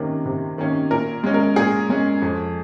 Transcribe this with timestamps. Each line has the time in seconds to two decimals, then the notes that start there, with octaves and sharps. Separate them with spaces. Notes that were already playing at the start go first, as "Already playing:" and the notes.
Already playing: C3 D#3 A#3 C#4
0.26 C3
0.58 D#3 A#3 C#4
0.91 A#2 A#4
1.24 G#3 C#4
1.34 A#4
1.56 A#2 G#4
1.89 G#3 C#4
2.22 F2